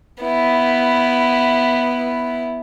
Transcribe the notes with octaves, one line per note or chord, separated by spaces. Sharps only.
B3 E4